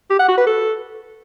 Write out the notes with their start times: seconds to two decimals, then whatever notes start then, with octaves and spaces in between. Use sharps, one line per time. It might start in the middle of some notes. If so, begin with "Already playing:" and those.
0.10 G4
0.19 F#5
0.28 F#4
0.38 B4
0.47 A4